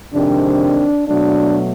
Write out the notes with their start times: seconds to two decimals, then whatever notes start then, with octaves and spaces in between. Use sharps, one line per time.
0.11 F2 C3 D#3 G#3 C4 D4
1.07 B2 F#3 A3 D4